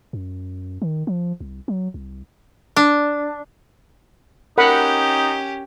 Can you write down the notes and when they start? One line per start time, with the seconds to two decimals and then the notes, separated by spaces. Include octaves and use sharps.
0.13 F#2
0.82 D#3
1.07 F3
1.40 C2
1.68 F#3
1.94 C2
2.76 D4
4.58 C#4 D#4 G4 A#4 F#5 B5